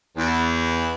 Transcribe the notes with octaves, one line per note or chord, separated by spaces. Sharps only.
E2